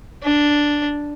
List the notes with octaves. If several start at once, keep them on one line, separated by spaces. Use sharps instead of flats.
D4